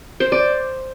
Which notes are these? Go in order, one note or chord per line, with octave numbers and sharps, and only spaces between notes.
C5
D5